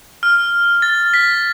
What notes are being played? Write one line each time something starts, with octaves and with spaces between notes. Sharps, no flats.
F6
A6
B6